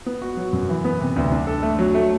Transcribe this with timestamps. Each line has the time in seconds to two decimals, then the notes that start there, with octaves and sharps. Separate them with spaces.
0.06 B3
0.21 F#4
0.37 F#3
0.53 F#2
0.69 E3
0.85 B3
1.00 C3
1.16 D2
1.32 D4
1.47 A4
1.63 A3
1.79 F#3
1.95 A3